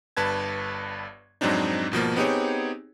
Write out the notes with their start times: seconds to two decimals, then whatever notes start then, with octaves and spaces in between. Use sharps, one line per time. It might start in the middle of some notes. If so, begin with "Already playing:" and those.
0.17 G1 G2 B4 A5 G#6
1.41 F2 G#2 F#3 C4 D4 D#4
1.92 G#1 B2 F3 A#3
2.16 B3 C4 D#4 G4 G#4 C#5